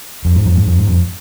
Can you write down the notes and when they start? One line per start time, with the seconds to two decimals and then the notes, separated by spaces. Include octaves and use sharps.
0.25 F2
0.36 G#2
0.45 F2
0.56 G#2
0.66 F2
0.77 G#2
0.87 F2